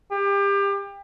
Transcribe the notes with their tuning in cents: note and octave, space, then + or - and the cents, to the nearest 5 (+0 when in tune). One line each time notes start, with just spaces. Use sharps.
G4 +30